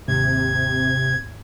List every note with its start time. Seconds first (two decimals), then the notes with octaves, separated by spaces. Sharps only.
0.08 G#1 D#2 C3 G#6